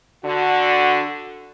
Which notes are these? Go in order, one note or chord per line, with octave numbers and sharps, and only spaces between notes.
D3 F#4